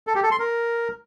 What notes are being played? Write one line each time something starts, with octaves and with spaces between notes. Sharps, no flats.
A4
G4
A4
C6
A#4